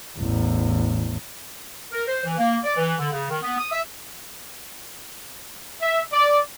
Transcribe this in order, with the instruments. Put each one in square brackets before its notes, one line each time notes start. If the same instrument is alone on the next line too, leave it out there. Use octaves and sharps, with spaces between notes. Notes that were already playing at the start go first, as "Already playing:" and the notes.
[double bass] A1 E2
[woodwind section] A#4
C5
E3
A#3
D5
E3
D3
C#3
D#3
B3
D#6
E5
[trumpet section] E5
D5